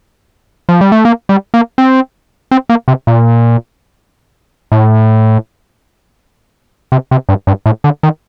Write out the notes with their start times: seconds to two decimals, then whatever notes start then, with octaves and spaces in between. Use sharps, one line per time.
0.69 F3
0.81 G3
0.92 A3
1.05 A#3
1.29 G3
1.54 A#3
1.78 C4
2.51 C4
2.69 A#3
2.88 C3
3.07 A#2
4.72 A2
6.92 C3
7.11 C3
7.29 G2
7.47 G2
7.66 A2
7.84 D3
8.03 D#3